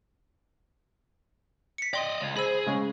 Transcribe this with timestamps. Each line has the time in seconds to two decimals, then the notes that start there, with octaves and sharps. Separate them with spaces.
1.78 B6 C#7
1.93 D5 D#5 G5 C6 A#6
2.20 C#2
2.36 G#4 C5 B5 E6
2.66 C#3 G#3 C#4 C#6